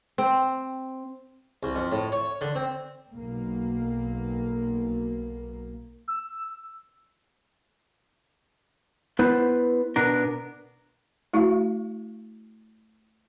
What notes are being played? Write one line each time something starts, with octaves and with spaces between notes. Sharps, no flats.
C4
C2
F2
A2
C#5
D3
C4
B1 A#3
E6
B3 E4 B4 C5 D5
B2 B3 D4 A#4
A3 E4 F#4 F5